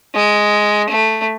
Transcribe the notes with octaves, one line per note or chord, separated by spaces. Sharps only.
G#3
A3